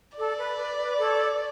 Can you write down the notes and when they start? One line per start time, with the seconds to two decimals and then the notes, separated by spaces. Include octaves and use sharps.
0.17 A4 D5
0.38 B4
0.58 B4
0.79 B4
0.98 A4 C#5